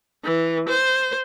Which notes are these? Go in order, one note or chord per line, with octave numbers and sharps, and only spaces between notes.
E3
C5